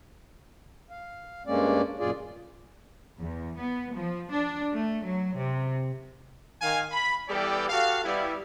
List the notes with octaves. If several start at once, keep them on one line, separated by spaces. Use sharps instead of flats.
F5
G2 G#3 A#3 C#4 D5
F#2 A#2 F4 G#4 D5
E2
B3
F3
D4
A3
F#3
C3
D#3 F5 G#5
B5
E3 G3 B3 G4 A4 D5
F#4 G4 A4 F5
G3 B3 E4